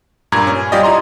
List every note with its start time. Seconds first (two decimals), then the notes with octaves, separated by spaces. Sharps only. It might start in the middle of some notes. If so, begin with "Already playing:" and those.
0.32 G2 A#2 A#5 G#6
0.47 C#4
0.72 G3 F4 G4 D5 D#5
0.83 E4 D#5 A#5 C6